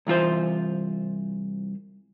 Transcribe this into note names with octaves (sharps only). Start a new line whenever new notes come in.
C2 E3 F4 C5